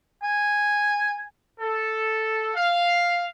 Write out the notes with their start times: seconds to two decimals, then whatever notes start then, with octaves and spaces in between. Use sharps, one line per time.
0.23 G#5
1.60 A4
2.56 F5